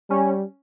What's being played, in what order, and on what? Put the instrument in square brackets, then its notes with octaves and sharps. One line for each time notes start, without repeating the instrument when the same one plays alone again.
[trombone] G3 [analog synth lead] C#4